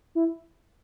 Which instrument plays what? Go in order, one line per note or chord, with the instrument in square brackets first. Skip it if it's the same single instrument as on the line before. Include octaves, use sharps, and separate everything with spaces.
[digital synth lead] E4